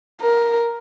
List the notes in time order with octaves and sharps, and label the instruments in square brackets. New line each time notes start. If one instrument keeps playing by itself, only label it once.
[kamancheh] A#4